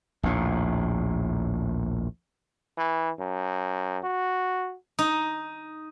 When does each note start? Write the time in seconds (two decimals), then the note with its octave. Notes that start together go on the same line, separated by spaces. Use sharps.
0.23 A#1 D#2 A2
2.78 E3
3.19 F#2
4.04 F#4
4.99 D#4